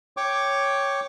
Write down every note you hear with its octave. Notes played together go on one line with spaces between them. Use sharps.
C#5 G5 C#6 D6